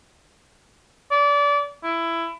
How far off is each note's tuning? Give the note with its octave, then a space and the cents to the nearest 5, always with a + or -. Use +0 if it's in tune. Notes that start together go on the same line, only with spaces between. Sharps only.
D5 -30
E4 +15